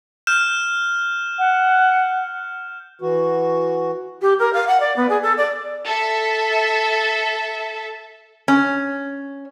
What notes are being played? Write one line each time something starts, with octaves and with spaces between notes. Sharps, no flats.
F6 G6 E7
F#5
E3 F#4
G4
A#4
F5
F#5
D5
B3
G#4
A4
D5
A4 E5
C#4